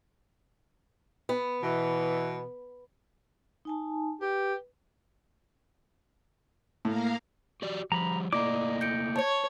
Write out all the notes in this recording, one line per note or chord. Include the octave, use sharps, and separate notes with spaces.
B3
B2 E3
D#4 G#5 A5
G4 B4
A2 A#3 A#4 F5
F#4 G4 D5
F3 G3 A#5 B5
A3 A#3 E4 D5 D#5 A#5 D6
G6 C#7 D7
C#5 A5 C#6